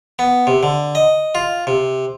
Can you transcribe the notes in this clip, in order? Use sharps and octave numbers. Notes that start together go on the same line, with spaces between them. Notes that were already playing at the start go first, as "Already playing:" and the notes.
B3
C3
D3
D#5
F4
C3